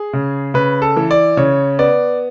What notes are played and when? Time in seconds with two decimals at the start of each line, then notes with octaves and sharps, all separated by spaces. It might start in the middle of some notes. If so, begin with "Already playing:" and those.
Already playing: G#4
0.13 C#3
0.54 C#3 B4
0.82 A4
0.97 E3
1.11 D5
1.37 C#3 C#5
1.79 B3 D5